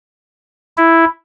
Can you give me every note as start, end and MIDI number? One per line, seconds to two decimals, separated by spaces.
0.77 1.05 64